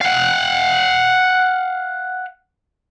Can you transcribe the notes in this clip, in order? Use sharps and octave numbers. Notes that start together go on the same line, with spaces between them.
F5 F#5